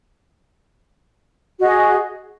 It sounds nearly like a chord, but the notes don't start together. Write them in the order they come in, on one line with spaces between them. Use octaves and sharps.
F#4 D#5 G#4